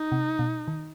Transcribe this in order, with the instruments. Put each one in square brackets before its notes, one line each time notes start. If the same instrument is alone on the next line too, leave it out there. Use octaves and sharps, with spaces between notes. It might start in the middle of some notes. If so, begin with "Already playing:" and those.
Already playing: [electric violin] D#4
[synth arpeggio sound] C3
B2
D#3